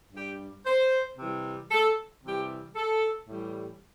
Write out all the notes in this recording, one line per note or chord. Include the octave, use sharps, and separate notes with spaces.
G2 G3 G4
C5
C3 E3 G3
A4
C3 E3 G3 G4
A4
A2 E3 G3